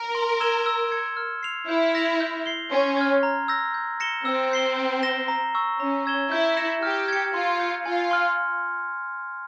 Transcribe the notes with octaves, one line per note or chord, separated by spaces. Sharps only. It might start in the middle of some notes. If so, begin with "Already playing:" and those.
Already playing: A#4
C6
E6 G#6 E7 G7
E6
G#6 C#7
F6
C7 F7
E4 G6
A#6 F7
G6
C7 G7
C#4 C6
F6 G#6
A#5
E6 G6 A#6
G6
A#6 C#7 E7 G7
C4 E6
G6 C7 G7
G6
A#6 E7 G7
A#5
C#6 E6
C#4 A#5
E6 G#6 E7 G7
E4 G6
A#6 C#7 E7
G4 F6
G#6 C#7
F4 C6
G6 C#7
F4 G#5
C6 F6